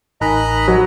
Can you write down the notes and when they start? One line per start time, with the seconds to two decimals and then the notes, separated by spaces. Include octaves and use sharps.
0.21 A1 D#4 A#4 D#5 G#5 A#5 B5 F#6
0.68 F#3